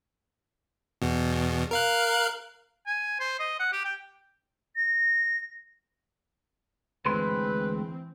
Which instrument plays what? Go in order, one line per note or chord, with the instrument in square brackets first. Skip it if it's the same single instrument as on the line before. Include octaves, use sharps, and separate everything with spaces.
[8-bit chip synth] E2 B2
A#4 F5 F#6
[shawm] G#5
C5
D#5
F#5
G4
G5
[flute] A#6
[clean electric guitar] D2 G#3 C6 [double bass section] E3 C4 [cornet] B4